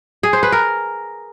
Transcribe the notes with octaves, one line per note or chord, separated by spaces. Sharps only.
G#4
C5
B4
A#4